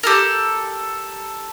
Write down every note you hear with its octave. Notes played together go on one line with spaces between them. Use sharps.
G4 A4 A#4